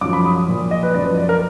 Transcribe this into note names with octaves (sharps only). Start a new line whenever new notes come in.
F#2 F3 D6
B5
D#6
D#6
A#2 F3
D#5
B4
F#2 F3 D5
B4
D5
A#4